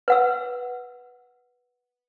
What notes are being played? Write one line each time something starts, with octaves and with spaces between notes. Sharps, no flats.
B4 F#5 E6